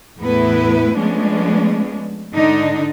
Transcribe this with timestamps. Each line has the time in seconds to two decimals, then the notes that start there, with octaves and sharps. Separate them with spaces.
0.20 E2 A2 A3 B3 E4 B4
0.96 F3 G#3 A3 B3 C#4 D4
2.34 G#2 D3 D4 D#4